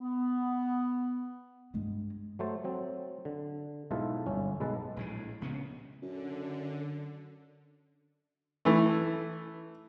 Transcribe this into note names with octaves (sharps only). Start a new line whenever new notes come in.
B3
G2 G#3
F#3 A3 C5 A5
F#3 C4
D3
B1 G#2 E4 F4 A4 E5
G1 C#4
B1 G#3 A4 B4 A5
A#1 A2 G#3
A#1 C#3 B3 C#4
F#2 D3
E3 A3